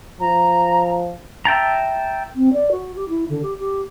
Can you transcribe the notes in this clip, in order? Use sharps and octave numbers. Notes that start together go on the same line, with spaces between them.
F3 A#5
E5 G5 A5 A#5
C4
D5
F#4
G4
E4
D3
G4
G4